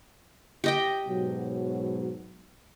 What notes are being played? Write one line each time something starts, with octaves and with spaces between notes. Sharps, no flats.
G4 D#5 G5
G#2 B2 F#3